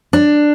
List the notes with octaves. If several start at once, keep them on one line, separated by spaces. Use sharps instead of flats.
D4